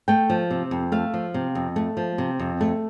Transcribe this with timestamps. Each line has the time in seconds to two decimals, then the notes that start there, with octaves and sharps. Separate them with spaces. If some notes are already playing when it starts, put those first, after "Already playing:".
0.08 A3 G5
0.30 F3
0.51 C3
0.71 F2
0.92 A3 F5
1.14 F3
1.34 C3
1.55 F2
1.76 A3
1.97 F3
2.18 C3
2.39 F2
2.61 A3